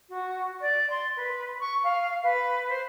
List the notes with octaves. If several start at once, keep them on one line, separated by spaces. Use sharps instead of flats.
F#4
D5
C6
B4
C#6
F5
B4
C5